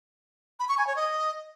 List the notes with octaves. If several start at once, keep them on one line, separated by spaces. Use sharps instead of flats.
B5
C#6
G#5
C#5
D#5